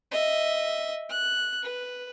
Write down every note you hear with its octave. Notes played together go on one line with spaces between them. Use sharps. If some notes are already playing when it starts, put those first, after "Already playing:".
D#5 E5
F#6
B4